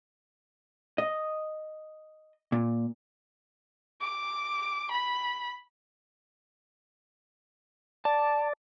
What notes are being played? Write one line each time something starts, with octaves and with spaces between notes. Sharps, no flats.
D#5
A#2
D6
B5
D5 A5